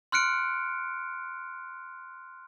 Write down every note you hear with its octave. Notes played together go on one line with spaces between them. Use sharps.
C6 F6 F#6 C#7 D7